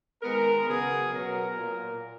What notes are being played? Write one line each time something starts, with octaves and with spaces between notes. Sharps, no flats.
D#3 G#3 B3 A#4
C#3 F#3 B3 G#4
B2 F#3 B3 A#4
A#2 A#3